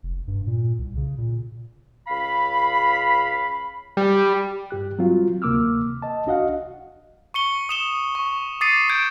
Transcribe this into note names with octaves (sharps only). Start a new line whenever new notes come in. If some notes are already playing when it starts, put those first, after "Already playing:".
F1
G2
A#2
C2
C#3
A#2
C#2 F5 B5
G3
G2 G4 F#6
F#3 G3 C4 F4 F#4
D2 C3 A#3 D6 E6 F6
D#5 A5
C2 D4 F#4 D#5 F5 F#5
C#6 C#7 G7
D#6 E7 G7
C#6
D6 D#6 A6 C7 C#7 D#7
G6 G#6 D7